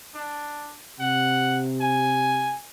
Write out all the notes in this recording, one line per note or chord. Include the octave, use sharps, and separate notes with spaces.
D4
C3 F#5
G#5